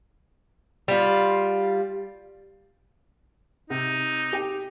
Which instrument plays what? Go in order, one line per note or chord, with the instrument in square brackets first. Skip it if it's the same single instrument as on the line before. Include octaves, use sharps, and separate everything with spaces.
[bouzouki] G3 F4
[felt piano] C3 [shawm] D#4
[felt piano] G4 G5